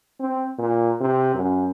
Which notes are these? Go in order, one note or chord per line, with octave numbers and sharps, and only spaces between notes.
C4
A#2
C3
F#2